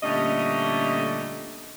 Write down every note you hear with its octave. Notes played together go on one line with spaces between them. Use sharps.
A#2 D3 G3 A3 C#4 D#5